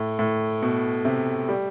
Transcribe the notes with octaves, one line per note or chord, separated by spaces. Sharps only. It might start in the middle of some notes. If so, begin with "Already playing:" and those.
Already playing: A2
A2
B2
C3
G3